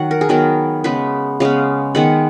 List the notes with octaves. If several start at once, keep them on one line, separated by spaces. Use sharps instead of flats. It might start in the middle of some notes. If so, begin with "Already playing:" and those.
Already playing: D#3 F#3 F#5
A#4
G#4
D#3 F#3 B3 A#4
C#3 G#3 B3 B4
C#3 G#3 B3 F5
D#3 G#3 B3 F#5